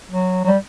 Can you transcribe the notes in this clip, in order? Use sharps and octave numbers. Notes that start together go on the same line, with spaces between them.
F#3
F#3
G3